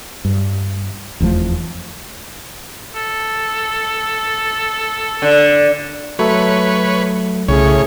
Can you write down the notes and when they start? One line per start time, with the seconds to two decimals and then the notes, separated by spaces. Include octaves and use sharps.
0.25 G2
1.20 F1 E2 F3 A3
2.95 A4
5.22 D3
6.19 F#3 A3 A4 B4 C#5
7.48 C2 A2 C#3 A3 G#4 C#5